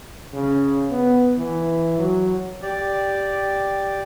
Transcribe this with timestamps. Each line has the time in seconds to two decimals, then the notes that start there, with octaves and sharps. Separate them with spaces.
0.33 C#3
0.90 B3
1.38 E3
1.98 F#3
2.62 G4 D5